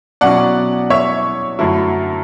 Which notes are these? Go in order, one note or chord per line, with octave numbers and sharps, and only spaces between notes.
B2 F#3 C#4 E4 D5 F#5
C#5 E5
F#2 D3 A3 E4